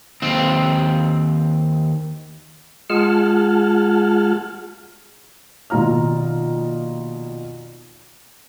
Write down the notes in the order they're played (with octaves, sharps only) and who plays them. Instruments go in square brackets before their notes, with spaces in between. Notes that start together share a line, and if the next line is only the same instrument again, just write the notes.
[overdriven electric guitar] D#2 C4
[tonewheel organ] G#3 F4 G#4 F#5 A5 F6
[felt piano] A#1 B2 D#3 F4 A#5 F6